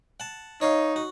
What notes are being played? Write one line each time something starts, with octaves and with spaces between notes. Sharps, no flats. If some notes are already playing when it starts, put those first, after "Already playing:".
F#5 A5
D#4 C#5 D#5 F5
F#4